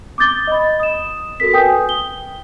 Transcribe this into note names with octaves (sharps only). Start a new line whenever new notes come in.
D6 D#6 G6 A6 G7
D#5 B5
D#6 E7
F#4 A4 A#4 B6
B4 G5 G#5 D#6 G6
G7